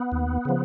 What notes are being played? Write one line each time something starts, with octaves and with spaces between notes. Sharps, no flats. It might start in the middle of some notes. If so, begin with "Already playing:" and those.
Already playing: B3
D#2
C#3 F3